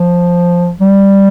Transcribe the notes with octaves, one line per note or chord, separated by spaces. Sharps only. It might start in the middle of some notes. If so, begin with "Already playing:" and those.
Already playing: F3
G3